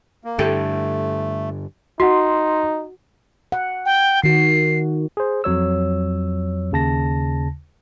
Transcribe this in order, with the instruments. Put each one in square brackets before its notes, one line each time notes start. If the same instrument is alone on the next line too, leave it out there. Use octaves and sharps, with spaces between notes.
[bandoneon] A#3
[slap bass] G2 D3 [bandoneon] A3 [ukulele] E4 G4 A4
[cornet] D#4 [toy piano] F#4 F#5 [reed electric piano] C6
[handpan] F#5
[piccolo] G5
[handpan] D#3 F#4 [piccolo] C7
[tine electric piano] G#4 C5
F2 F#3 C#5 E6
D#2 C#3 A5 A#6